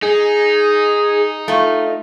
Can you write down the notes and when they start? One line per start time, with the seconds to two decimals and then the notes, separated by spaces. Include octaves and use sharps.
0.02 D#4 G#4
1.48 A3 F4